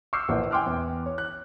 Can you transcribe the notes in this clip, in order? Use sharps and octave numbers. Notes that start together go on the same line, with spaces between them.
C#6 D6 E6 F6 G6 C7
A#1 E3 A#3 D5 F#5
G5 G#5 C6 D6 F6 F#6
E2
C#5
F#6